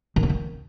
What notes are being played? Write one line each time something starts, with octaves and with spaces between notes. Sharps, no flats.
D#3
B3
D#3